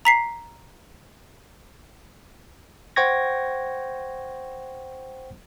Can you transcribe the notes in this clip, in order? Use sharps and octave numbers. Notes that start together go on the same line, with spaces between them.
A#5 B6 C7
C5 F#5 G5 C#6 G#6 A#6